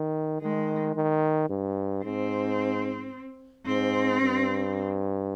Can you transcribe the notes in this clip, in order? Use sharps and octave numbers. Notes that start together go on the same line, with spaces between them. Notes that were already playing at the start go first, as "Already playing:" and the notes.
Already playing: D#3
D#3 G#3
D#3
G2
G#2 C4
G#2 C4
G2